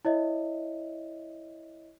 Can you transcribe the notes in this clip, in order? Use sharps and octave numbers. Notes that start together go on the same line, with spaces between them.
E4 C#5 D#5 E5